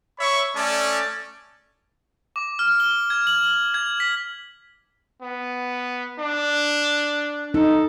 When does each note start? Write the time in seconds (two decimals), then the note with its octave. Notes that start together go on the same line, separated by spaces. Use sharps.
0.19 C#5 E5 B5 C#6
0.56 A3 C#4 D5 A5
2.36 D6
2.59 F6
2.80 G7
3.10 G#6
3.27 F#7
3.74 G#6
4.00 B6
5.22 B3
6.19 D4
7.54 D#4 A4